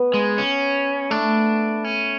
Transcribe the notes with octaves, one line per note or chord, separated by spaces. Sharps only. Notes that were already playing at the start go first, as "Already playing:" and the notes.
Already playing: B3
G#3
C#4
A3 D4
C#4